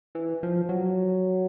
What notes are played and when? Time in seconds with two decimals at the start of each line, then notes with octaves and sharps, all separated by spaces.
0.15 E3
0.43 F3
0.69 F#3